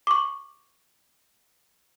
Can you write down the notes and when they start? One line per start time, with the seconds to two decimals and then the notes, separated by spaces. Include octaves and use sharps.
0.07 C#6 D6